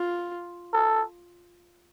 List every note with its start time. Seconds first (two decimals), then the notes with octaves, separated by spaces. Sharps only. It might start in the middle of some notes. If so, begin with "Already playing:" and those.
Already playing: F4
0.73 A4